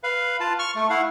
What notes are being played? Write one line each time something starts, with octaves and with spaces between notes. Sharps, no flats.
B4 F5
F4 A5
C#6 F6
A3
E4 F5 F#5